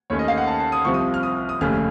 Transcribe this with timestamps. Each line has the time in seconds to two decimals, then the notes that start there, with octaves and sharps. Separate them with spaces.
0.10 D#2 D#3 A3 C#4 C#5
0.19 D#5
0.28 F5
0.38 F#5
0.47 A5
0.60 A5
0.72 D#6
0.85 C2 C3 F3 C#6
0.94 D#6
1.14 F6
1.23 D#6
1.49 D#6
1.61 F1 D#2 C#3 A3 C#4 F6